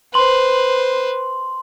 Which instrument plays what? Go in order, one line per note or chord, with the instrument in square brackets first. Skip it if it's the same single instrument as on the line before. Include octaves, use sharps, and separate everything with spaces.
[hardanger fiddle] B4 C5 [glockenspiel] C6 F#7